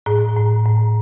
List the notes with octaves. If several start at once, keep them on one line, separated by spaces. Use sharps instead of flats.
A2 G#4
A2
A2